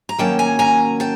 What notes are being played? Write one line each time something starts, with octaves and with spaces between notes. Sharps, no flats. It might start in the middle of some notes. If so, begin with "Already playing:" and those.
A#5
D#3 F#3 A#3 C#4 G5 A5
G#5 A#5
G#5 A#5
G5 A5